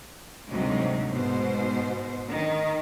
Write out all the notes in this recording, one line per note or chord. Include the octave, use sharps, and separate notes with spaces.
D2 G#2 C3 F#3 G3 D#4
G#2 B2 C5
D#3